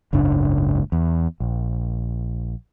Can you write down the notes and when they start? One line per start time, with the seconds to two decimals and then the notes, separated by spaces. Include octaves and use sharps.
0.13 F#1 C#2 G#2 D4
0.92 E2
1.40 A#1